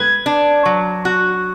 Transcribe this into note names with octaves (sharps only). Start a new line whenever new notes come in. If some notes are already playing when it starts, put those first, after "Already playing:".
Already playing: B4 G#6
D4
F#3
F#4